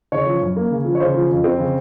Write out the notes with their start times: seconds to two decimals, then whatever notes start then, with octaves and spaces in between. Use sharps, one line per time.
0.12 C#3 C#5
0.26 F3
0.41 F#2
0.56 A#3
0.70 C#3
0.85 F3
0.95 C#5
1.00 C#3 C5
1.14 F3
1.29 F2
1.44 C4
1.58 C#3